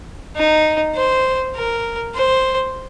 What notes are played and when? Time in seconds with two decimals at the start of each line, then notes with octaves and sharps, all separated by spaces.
0.37 D#4
0.96 C5
1.56 A#4
2.15 C5